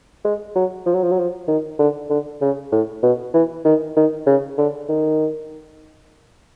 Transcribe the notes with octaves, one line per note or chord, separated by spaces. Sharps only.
G#3
F#3
F3
F#3
F3
F#3
F3
D#3
D3
D3
C#3
A2
B2
E3
D#3
D#3
C#3
D3
D#3